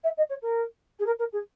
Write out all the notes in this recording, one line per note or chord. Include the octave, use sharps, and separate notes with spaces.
E5
D#5
C#5
A#4
G#4
A#4
A#4
G#4